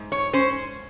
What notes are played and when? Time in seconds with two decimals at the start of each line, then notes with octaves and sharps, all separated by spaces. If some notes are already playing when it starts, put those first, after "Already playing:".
Already playing: G#2
0.12 C#5
0.33 C#4 C5